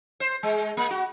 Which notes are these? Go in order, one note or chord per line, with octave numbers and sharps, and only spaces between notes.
C5
G#3
A#3
F#4